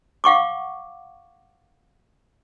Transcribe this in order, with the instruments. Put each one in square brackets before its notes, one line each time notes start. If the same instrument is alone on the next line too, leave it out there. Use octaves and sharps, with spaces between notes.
[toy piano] F5 F#5 C#6 D6